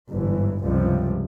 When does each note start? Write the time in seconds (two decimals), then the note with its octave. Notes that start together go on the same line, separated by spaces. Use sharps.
0.13 G1 G#2 E3
0.64 C#2 G2 C3 F3 G3